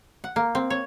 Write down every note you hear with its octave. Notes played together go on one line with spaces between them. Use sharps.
F#5
A#3
C4
C#5